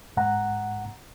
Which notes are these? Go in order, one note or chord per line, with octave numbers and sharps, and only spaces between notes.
G#2 F#5 A#5